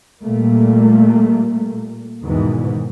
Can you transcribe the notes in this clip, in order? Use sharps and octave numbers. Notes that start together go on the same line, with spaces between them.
A#2 G3 A3 A#3
E2 G#2 B2 D#3 E3